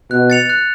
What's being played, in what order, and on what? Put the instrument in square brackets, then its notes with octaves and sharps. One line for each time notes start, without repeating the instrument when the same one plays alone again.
[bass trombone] B2 [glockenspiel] F#6
[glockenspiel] A6 C#7 F7
F#6